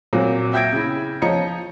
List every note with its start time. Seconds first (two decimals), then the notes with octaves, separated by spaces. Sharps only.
0.13 A#2 F#3 C4
0.53 E5 G5 G6 G#6 A#6 D7
0.72 C#3 E4
1.22 F3 C#5 D#5 A#5 C#7